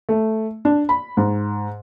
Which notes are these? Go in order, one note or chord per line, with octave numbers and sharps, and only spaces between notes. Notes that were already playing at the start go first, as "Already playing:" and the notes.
A3
D4
B5
G#2